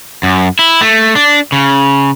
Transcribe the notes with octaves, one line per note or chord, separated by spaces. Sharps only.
F#2
E4
A3
D4
C#3